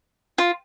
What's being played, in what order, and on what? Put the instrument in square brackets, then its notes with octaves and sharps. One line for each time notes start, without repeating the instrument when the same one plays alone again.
[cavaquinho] F4